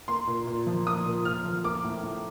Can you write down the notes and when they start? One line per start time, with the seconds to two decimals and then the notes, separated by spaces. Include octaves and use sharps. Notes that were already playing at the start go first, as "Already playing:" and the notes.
0.08 A#3 C6
0.27 A#2
0.47 A#2
0.67 F3
0.86 A#3 D#6
1.06 A#2
1.25 A#2 F6
1.45 F3
1.64 A#3 D6
1.84 A2
2.03 A2